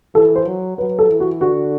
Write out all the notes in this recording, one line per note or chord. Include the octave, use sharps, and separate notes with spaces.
E3 A4
C5
F#3
F#3 B4
A4
E3
F#4
D3 F#4